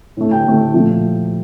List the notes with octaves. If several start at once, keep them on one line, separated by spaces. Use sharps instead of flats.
A2 A3
G5
A2 A3
A#2 F3 A3